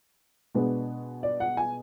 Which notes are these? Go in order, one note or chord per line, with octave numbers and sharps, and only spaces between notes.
B2 G#3 B3 D4
D5
F#5
G#5